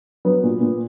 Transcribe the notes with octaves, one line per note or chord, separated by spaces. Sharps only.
F#3 B3
A#2
A#2